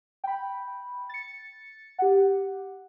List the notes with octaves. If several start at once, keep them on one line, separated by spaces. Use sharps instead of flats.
G5 B5
A6 C#7
G4 F#5